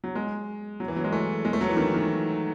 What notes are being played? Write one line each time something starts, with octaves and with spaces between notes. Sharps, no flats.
F#3
G#3
F#3
E3
F#3
G#3
A3
G#3
A3
F#3
E3
D#3
D#3